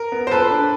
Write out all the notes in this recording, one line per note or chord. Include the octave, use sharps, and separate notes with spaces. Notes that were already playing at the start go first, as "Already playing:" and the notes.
Already playing: A#4
B3
C5
A#2 A4 B4
D4